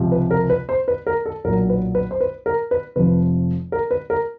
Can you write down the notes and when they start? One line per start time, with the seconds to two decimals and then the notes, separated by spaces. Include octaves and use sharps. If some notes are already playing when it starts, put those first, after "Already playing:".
Already playing: C#2 C3 F3
0.12 B4
0.31 A#4
0.50 B4
0.69 C5
0.88 B4
1.07 A#4
1.26 A4
1.44 B1 A#2 F#3 A#4
1.70 B4
1.95 B4
2.11 C5
2.20 B4
2.46 A#4
2.71 B4
2.96 F1 F2 C3 F3 B4
3.72 A#4
3.91 B4
4.10 A#4